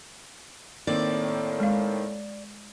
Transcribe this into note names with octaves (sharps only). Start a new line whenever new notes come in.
A2 D#3 A#3 C4 D5
G#3 F5